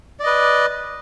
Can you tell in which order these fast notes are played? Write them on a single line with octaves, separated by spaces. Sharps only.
D5 D#5 B4